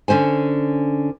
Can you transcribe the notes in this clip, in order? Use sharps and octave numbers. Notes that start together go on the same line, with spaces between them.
D3 C#4 C5 G#5